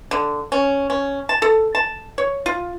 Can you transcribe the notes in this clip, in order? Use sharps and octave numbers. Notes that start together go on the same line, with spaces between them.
D3
C#4
C#4
A5
A4
A5
C#5
F4